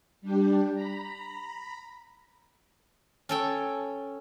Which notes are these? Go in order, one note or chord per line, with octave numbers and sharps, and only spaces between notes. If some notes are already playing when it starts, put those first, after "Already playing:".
G3 D4 G4
A#5 B5
C#4 A4 G5